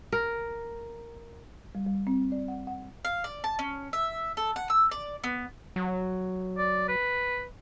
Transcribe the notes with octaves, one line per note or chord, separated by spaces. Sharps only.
A#4
G3
G3
C4
D5
F#5
F#5
F5
D5
A5
C#4
E5
A4
F#5
E6
D5
B3
F#3
D5
B4